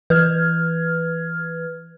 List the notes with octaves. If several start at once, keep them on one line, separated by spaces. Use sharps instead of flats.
E3 B4 F6 G#6